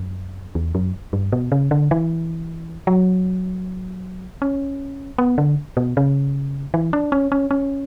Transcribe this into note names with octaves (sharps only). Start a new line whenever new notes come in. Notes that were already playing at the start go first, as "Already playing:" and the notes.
Already playing: F#2
E2
F#2
G2
B2
C#3
D3
E3
F#3
C#4
B3
D3
B2
C#3
E3
D4
C#4
C#4
C#4